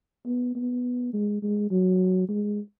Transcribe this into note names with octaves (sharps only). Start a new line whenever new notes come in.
B3
B3
G#3
G#3
F#3
G#3